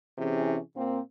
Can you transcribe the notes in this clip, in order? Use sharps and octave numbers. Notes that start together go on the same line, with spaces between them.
C3 E3 C#4 E4 G#4
A#2 A#3 C4